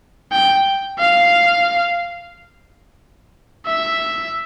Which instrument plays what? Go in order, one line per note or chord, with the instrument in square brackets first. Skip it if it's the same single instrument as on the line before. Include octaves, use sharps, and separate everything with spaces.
[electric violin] G5
F5
E5